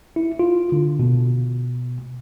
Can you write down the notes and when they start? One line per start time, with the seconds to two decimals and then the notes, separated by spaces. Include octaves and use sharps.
0.16 E4
0.39 F4
0.72 D3
0.99 B2